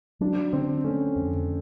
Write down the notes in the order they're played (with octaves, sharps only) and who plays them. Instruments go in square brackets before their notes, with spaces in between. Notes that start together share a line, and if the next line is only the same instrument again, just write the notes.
[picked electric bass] F#3 [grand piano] D4
[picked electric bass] D3 [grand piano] C4
[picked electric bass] A3 [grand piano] C#4
[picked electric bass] F2